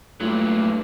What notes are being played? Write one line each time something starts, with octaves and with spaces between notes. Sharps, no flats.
G2 A#2 F#3 A3 E4 F4 G4